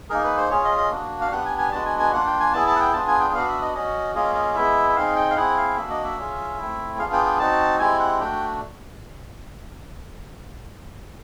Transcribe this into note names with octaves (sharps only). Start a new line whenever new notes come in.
A#3 D#4 G#4 A#4
B4
C5
C#4 F4 G#4 C#5
D#5
D#5
A#3 D4 F#4
F5
B3 D4 G4 F#5
G#5
G#5
G#3 B3 D4 F#4 A5
G#5
G#5
A#3 D4 F4 F#5
G5
G#5
B3 E4 G#4 A5
A5
F#5
G5
B3 D4 F4 G#4 A5
G#5
G5
B3 D4 F#4 F5
E5
D#5
C#4 F#4 D#5
A#3 C#4 F4 G#4 D#5
D#5
G#3 B3 E4 E5
E5
C4 D#4 G#4 F5
G5
F5
C4 E4 G#4 F#5
F5
A#3 D4 F#4 E5
D#5
E5
C#4 F4 G#4
A3 C4 E4
B3 D4 F4 G#4 F5
G5
G5
C4 D#4 F#4 A5
G#3 C4 E4 G4 G#5
F#5
A3 D4 F#4 G5